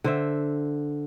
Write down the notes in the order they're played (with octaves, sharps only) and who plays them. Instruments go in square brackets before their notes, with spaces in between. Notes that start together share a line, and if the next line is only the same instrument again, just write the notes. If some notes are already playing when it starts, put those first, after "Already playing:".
[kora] D3 C5 E5